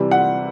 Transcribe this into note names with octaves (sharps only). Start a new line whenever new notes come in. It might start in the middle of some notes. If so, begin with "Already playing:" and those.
Already playing: C3 E3 G3
F#5